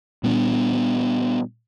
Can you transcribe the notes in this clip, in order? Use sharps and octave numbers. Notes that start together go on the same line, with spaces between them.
A#2 G3 B3 D4